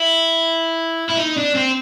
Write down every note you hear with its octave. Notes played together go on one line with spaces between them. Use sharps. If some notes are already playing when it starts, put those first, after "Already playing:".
Already playing: E4
E4
D#4
D4
C4